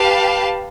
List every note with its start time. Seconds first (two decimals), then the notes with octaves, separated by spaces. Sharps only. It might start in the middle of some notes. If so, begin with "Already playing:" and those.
Already playing: G4 B4 F5 A5